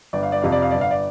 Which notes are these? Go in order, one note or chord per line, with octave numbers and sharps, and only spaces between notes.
G1 D5
F5
D5
F2 C3 F5
D5
F5
G1 D5
F5
D5